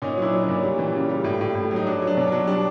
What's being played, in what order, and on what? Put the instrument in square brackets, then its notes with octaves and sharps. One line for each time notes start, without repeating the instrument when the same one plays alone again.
[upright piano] A#2 C#4 D#4
F#3 D4 E4
F#3
C#4
A#2
G3
E3
C#3
G3
A2
A2
A2
F#3
D#4
F#3 D4
F#3
D4
B2
F#3 D4
G3 D4